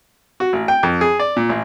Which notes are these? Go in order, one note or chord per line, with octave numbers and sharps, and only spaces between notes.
F#4
A1
G5
F2
G#4
D5
A#2
A1